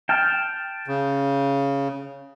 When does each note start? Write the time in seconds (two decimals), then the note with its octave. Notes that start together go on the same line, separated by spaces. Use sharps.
0.09 G5 A5 F6
0.88 C#3